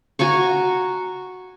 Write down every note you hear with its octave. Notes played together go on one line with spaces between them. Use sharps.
F#4 G#5 A#5 C#6